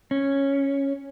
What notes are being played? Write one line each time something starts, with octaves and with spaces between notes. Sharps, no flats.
C#4